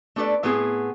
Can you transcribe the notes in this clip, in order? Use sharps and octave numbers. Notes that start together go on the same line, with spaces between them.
A3 D4 A4 B4 D5
A2 B3 C4 E4 G#4